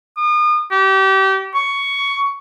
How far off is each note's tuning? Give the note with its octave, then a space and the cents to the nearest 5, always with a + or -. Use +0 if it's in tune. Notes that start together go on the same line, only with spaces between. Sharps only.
D#6 -40
G4 -30
C#6 +10